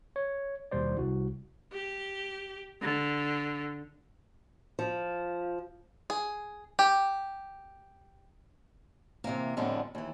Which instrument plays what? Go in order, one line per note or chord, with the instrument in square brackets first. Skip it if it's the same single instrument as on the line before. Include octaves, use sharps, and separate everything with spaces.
[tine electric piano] C#5
D#2 B2 G3 C5 D5
C2 F#4
[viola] G4
D3
[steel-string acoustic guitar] F3
[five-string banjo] G#4
G4
[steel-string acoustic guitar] C3 D#3 E3 A#3
F2 A2 D3 G3 G#3 B3
D#2 E3